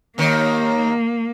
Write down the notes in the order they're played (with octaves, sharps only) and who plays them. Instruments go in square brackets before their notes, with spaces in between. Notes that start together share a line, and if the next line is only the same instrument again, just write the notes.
[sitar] D#2 D#3 [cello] A#3